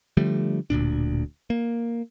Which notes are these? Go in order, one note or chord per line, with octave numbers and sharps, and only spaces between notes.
D3 F3 G3 A3
D1 D2 A#2 D4
A#3